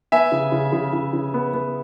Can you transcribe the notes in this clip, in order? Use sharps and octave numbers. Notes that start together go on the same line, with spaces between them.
B3 E5 G#5
C#3
C#3
C#3
C#3
C#3
B3
B3